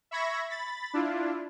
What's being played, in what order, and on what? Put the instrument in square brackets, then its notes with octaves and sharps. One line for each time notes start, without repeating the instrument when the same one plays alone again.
[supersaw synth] E5 B5 C#6 G#6 A#6
B5 A6
D4 E4 F4